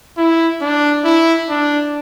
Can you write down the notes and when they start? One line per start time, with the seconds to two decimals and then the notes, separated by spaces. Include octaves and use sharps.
0.18 E4
0.62 D4
1.04 E4
1.49 D4